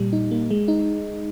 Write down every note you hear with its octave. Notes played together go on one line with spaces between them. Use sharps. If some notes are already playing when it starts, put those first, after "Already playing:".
Already playing: A#2 G3
D#4
A#3
G#3
D#4